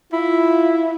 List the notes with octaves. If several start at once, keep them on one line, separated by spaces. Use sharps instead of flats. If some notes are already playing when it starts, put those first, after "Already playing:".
E4 F4